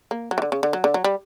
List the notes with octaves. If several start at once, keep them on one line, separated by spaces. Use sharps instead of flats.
A#3
F#3
E3
D3
C#3
D3
F#3
D3
F#3
G3